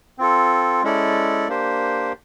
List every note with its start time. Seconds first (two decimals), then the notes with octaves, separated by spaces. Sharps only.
0.18 C4 F4 A4
0.83 G#3 C#4 E4 A4 D5
1.48 A#3 D4 G4 C5